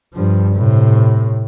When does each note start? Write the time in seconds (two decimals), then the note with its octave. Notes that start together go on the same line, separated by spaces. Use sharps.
0.14 G2 F3
0.56 A2 C3